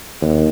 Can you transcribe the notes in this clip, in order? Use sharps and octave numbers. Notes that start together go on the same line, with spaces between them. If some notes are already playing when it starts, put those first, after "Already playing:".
D#2